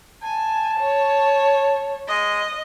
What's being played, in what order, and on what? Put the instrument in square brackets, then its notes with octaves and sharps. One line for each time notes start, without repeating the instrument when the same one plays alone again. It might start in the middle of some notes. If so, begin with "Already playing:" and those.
[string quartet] G#5 [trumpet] A5
[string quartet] C#5
[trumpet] G#3 [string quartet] D#5